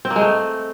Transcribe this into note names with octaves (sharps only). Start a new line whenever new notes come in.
C4
A#3
G#3
A3